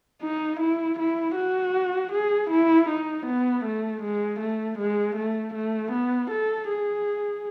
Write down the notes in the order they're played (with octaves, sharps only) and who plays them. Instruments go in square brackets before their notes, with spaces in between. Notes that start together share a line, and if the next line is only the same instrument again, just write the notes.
[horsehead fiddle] D#4
E4
E4
F#4
G#4
E4
D#4
B3
A3
G#3
A3
G#3
A3
A3
B3
A4
G#4